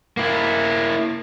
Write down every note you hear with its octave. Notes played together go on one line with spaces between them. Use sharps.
A#3 E4